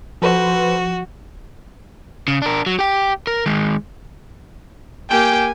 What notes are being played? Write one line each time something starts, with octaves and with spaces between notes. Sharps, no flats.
F3 F#4 A4 B4 C5
C#3
D4 A#4
F#3
G4 G5
A#4
D#3 G#3
A#3 G4 G5 G#5